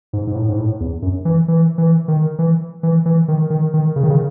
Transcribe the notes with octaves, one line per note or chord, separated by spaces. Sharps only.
G#2
G#2
A2
G#2
A2
E2
F#2
E3
E3
E3
D#3
E3
E3
E3
D#3
D#3
D#3
C#3
D#3
C#3